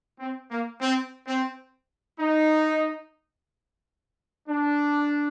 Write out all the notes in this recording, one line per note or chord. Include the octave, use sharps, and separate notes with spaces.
C4
A#3
C4
C4
D#4
D4